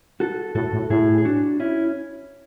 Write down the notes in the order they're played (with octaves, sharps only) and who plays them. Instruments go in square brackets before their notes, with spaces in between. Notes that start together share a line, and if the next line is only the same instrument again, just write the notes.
[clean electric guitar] F#4 A4
[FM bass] A2 [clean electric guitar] F#4 A4
[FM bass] A2
[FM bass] A2 [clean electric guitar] E4 G#4
[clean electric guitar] G#4
D4 F#4
C#4 E4